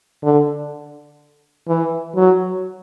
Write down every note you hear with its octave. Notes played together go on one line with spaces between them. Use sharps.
D3
E3
F#3